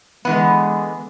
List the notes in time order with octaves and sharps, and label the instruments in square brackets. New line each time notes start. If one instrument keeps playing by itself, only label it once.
[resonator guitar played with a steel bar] D3 E3 B3 [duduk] G#3